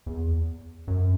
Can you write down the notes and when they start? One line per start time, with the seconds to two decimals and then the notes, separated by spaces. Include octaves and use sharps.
0.06 E2
0.88 F#2